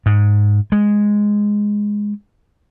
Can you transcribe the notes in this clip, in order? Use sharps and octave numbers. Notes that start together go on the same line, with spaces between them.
G#2
G#3